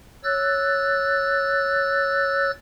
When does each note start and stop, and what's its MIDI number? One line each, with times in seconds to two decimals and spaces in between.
0.24 2.51 73
0.24 2.51 88
0.24 2.51 90
0.24 2.51 93